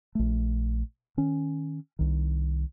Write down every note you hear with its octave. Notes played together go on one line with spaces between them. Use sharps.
A#1 A3
D#3 C#4
C2 D#3